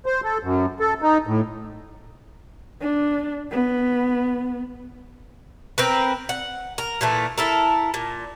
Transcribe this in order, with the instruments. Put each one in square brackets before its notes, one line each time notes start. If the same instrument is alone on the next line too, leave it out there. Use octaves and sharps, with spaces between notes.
[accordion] C5
A4
F#2
A4
D#4
A2
[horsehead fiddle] D4
B3
[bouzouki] C4 A#4 B4
F#5
A#4
A#2 E3 A3
E4 A4 A#4
A#2